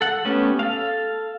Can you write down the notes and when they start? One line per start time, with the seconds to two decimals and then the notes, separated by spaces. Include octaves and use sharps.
0.01 A4 F#5
0.25 A3 B3 C#4 G4
0.59 A4 F5